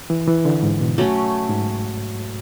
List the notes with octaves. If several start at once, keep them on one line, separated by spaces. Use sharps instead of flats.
E3
E3
D3
G#2
B2
F#3 A3 C#4
G#2